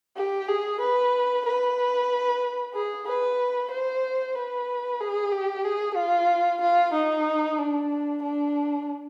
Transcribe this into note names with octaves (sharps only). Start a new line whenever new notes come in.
G4
G#4
B4
B4
G#4
B4
C5
B4
G#4
G4
G#4
F4
F4
D#4
D4
D4